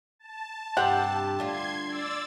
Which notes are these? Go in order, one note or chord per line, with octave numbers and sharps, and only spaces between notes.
A5
G2 C3 G4 C5 E5 F#5
D2 G3 F4 C6 G#6
D5 E6 A6